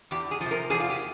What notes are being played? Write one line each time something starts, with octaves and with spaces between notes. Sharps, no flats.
E2 G4
G#4
C3 F3
A#4
E2 G#4
F4
G4